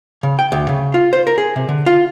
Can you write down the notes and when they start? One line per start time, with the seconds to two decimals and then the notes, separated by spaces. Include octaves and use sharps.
0.23 C#3
0.39 G5
0.52 D2
0.69 C#3
0.94 F4
1.13 C5
1.27 A#4
1.38 G#4
1.56 C3
1.69 D3
1.86 F4